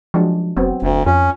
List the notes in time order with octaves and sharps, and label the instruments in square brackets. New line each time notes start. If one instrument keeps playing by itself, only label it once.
[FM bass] F3 [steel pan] F#3 G#3 D4
[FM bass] F1 [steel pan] F#3 B3 C4
[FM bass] F1 [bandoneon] D2
[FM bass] F2 [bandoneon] C#4 [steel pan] F4